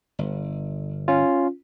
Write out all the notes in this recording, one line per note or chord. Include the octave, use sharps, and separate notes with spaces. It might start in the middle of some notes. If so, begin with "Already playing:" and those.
G1
C#4 F4